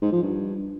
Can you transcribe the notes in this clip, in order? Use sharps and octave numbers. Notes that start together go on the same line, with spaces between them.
G#2
F3
G2